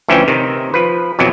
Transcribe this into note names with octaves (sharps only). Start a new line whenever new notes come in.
D2 E3 F3 C#4 E5 G5
C3 D#3
F3 B4
F2 B2 E3 F#3